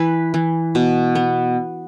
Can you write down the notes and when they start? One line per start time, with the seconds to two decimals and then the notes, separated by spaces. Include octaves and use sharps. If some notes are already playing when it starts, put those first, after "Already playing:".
Already playing: E3 B4
0.34 E3
0.75 B2
1.15 B3